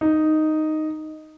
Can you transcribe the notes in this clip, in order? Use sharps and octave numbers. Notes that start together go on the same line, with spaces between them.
D#4